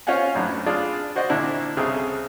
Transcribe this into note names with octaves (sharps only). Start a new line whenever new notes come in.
C#4 F4 C5 F5 F#5 G#5
F#2 A2 F#3 B3 D4
D4 F4 G#4 D5
F#4 C5 D5 D#5
A#2 D3 D4 E4
C2 C#3 C4 G#4 A4